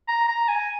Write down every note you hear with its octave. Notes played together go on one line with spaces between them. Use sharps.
A#5
A#5
G#5